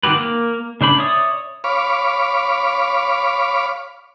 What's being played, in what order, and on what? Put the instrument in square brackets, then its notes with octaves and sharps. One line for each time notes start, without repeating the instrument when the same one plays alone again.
[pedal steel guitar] D#3 C4 F#4 G4 B4
A#3
C#3 D4 C5 B5
C#5 D5 E5 C#6 D#6
[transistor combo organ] C#5 F5 B5 D6